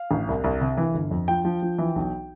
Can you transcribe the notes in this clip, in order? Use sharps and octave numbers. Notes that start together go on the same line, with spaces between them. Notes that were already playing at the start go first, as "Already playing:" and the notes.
Already playing: F5
A1
C2
C2
C3
E3
G1
F2
F3 G5
F3
F3
E3
B1